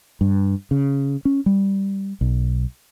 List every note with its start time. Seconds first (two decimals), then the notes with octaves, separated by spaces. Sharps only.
0.21 G2
0.71 C#3
1.25 C#4
1.46 G3
2.21 B1